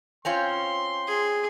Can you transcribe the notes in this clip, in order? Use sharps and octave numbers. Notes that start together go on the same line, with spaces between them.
C4 C#4 F4 C6
G#4